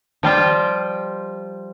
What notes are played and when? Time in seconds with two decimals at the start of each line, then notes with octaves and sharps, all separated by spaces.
0.23 F3 G3 F4 G5